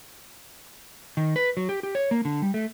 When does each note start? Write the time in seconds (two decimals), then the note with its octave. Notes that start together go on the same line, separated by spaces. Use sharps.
1.17 D#3
1.36 B4
1.57 F#3
1.69 G4
1.83 G4
1.95 C#5
2.11 A#3
2.25 D3
2.42 G3
2.54 A3